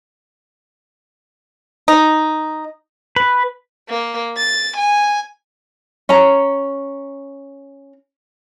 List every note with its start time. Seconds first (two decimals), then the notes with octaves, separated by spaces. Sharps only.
1.88 D#4
3.16 B4
3.89 A#3
4.38 A6
4.77 G#5
6.09 C#4 A#5